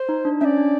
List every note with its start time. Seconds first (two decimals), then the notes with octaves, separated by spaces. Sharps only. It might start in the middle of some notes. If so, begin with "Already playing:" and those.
Already playing: C5
0.09 D#4
0.25 D4
0.41 C#4 D5 E5
0.57 D4